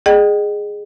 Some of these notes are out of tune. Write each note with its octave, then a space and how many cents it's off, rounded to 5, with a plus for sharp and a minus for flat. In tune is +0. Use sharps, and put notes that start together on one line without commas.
G#4 +0 D#5 -35 G5 -30